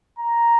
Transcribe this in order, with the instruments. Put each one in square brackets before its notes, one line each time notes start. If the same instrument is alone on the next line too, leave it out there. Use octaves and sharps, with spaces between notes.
[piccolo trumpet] A#5